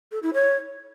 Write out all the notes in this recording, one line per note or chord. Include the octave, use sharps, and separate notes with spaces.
A4
E4
C#5